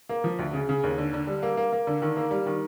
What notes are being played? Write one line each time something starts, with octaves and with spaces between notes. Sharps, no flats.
A#3
F3
D2
C#3
C#3
D#2
D3
D3
G3
A#3
A#3
A#3
D3
D#3
A#3
G3
D#3